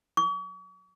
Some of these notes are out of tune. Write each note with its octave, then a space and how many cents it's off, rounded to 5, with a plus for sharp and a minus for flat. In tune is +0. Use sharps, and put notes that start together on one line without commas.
C#6 +45